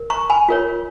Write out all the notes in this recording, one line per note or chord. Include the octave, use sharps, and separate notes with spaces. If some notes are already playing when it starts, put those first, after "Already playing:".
Already playing: A#4
A#5 C#6
G#5 B5
F4 A#4 C#5